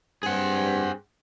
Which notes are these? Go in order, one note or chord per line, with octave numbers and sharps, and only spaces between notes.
G2 C4 G#4 F#5